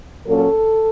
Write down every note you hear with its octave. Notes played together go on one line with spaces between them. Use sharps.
A#2 F#3 A#3 C#4 A4